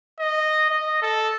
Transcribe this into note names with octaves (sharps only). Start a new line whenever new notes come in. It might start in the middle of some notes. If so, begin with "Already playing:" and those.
D#5
D#5
A4